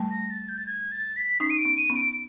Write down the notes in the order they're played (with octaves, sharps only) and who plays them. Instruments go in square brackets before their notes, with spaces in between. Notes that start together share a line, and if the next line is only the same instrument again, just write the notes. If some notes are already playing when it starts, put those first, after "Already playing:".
Already playing: [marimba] G3 A3
[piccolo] A#6
A6
G6
A6
G#6
A6
B6
[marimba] C#4 D#4 [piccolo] C7
[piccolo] D#7
D7
[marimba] B3 C#4
[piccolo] D#7
[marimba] B3 C#4
[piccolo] D7